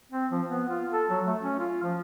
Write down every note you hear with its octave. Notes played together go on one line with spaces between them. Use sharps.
C4
F3
B3
F4
A4
F#3
A3
C#4
F4
F3